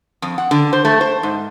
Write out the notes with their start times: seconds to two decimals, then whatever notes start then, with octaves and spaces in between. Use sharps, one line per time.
0.22 F2
0.38 F#5
0.51 D3
0.73 C5
0.85 A3
1.01 C5
1.23 G#2